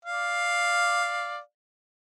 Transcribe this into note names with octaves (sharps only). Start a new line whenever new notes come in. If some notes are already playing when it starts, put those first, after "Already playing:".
D5 F5